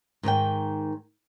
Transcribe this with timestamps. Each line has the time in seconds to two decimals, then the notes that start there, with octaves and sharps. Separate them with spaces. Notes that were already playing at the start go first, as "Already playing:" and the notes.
0.23 G#2 D#3 A#4 G5